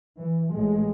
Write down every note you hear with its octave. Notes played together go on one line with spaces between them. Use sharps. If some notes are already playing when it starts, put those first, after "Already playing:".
E3
A1 A2 G#3